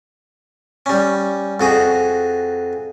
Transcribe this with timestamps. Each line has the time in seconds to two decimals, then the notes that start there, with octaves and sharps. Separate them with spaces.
0.86 G3 C#4
1.60 F2 F#4 G#4 A#5